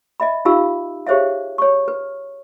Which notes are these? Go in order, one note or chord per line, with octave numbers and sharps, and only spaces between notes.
D#5 E5 B5
D#4 F4 G4 F5 B5 E6
G4 G#4 C5 C#5 E5 F5
C#5 C#6
B4